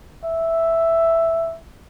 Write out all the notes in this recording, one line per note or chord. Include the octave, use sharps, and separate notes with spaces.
E5